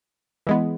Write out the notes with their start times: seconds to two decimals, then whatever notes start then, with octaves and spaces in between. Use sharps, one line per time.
0.47 E3 G#3 B3